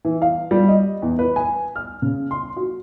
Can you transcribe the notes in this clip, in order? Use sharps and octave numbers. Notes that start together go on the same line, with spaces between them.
E3
F5
G3
D#5
E2
B4
G#5
F6
C#3
C6
F#4